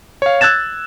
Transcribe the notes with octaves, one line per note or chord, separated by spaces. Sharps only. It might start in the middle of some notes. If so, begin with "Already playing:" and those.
C#5 F5
E6 F#6 G#6 A6 E7